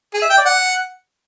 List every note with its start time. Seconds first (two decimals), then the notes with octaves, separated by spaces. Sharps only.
0.14 G#4
0.22 E5
0.30 G5
0.38 D5
0.46 F#5